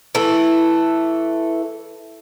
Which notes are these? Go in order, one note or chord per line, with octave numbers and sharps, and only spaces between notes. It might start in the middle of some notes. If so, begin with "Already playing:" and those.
E3 A3 E4